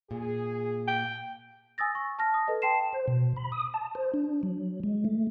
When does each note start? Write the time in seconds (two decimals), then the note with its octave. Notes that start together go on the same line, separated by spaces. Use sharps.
0.11 A#2 G#4
0.87 G5
1.78 G#5 D#6 E6 A6 A#6
1.95 C#6
2.19 A5 F6 A#6
2.34 D#6
2.48 A4 B4 D#5
2.62 G5 A5 C6 C7 E7
2.93 C5
3.08 B2
3.36 B5
3.52 D#6
3.74 A5
3.95 C5
4.14 D4
4.43 F#3
4.84 G#3
5.05 A3